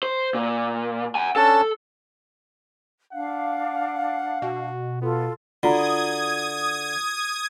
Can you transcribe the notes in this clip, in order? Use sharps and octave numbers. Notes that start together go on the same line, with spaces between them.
C5
A#2
F#5 G#5
C#4 D4 A4 A5
D4 F5 F#5
B2 F#4
B3 F4 A4
D3 F4 F#4 A#5 D#6 G#6